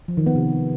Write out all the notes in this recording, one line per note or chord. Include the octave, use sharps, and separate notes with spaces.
F3
D#3
B3
C3